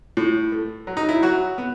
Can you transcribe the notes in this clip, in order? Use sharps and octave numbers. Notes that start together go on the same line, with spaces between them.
A2
A3
F#3
D#4
E4
F#3 F#4
B3